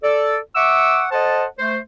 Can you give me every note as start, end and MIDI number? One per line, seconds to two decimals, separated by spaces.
0.04 0.37 69
0.04 0.37 74
0.55 1.05 76
0.55 1.05 78
0.55 1.05 85
0.55 1.05 86
0.55 1.05 88
1.12 1.45 69
1.12 1.45 72
1.12 1.45 75
1.12 1.45 78
1.12 1.45 81
1.59 1.78 57
1.59 1.78 72